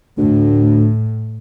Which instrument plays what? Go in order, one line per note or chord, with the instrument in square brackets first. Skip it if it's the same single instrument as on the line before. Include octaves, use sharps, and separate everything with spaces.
[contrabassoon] D2 [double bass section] A2